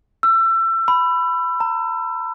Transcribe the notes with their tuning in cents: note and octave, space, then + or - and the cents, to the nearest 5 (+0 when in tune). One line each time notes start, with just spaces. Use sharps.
E6 +30
B5 +10
A#5 -30